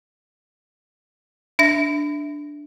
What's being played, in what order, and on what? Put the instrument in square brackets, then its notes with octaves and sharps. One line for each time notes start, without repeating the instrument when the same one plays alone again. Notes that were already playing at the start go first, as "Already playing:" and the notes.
[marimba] D4 E5 A#6